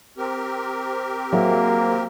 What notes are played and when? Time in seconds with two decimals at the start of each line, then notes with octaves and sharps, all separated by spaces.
0.18 C4 G4 A#4
1.33 F#3 A#3 G#4 E5